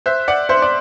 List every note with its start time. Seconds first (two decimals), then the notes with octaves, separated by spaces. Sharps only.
0.06 C5 E5 F#6
0.28 D5 F#5
0.49 C5 E5 C6
0.62 D5